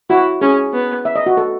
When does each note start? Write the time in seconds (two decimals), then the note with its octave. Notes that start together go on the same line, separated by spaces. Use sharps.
0.10 E4 F#4
0.41 C#4 G#4
0.73 B3
1.05 E5
1.16 D#5
1.26 F#4
1.37 A4